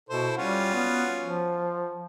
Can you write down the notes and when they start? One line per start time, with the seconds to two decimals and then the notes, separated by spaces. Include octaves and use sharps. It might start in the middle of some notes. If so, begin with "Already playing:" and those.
0.10 B2 E4 A4 C5
0.37 G3 C#4 F4 F#4
0.74 B3
1.22 F3